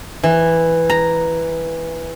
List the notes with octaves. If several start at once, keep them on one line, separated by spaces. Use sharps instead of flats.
E3
A#5